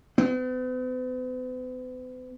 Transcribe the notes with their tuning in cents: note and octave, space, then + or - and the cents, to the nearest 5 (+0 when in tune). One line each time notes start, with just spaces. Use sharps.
B3 +45